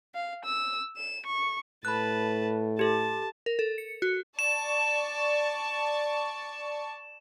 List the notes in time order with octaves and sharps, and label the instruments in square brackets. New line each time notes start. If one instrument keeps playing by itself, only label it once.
[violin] F5
E6
E7
C#6
[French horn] A2 [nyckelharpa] B4 A5 [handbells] B5 F#6
[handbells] G4 A4 [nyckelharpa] A5
[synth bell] A#4
A4
C#7
F#4
[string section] D5 A5 C#6 [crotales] E7